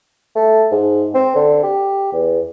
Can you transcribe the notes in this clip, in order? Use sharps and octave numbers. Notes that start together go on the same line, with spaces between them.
A3
G#2
C4
D3
G4
E2